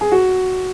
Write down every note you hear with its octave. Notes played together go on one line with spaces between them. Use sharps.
G#4
F#4